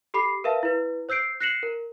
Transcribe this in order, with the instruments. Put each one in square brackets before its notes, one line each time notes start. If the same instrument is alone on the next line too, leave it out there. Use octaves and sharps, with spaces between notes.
[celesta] G4 A4 B5 D6 C7
A#4 B4 E5 F5 A5
E4 B4
C5 E6 G6 C7 D7
F#6 A#6 C7 C#7 E7 F#7
A#4